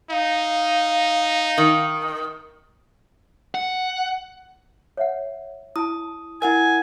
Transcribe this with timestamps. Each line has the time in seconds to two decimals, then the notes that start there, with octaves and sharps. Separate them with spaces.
0.10 D#4 F5
1.58 D#3
3.55 F#5
4.97 C#5 E5 F#5
5.76 E4 A5 D#6
6.42 E4 A#4 F#5 G#5 G#6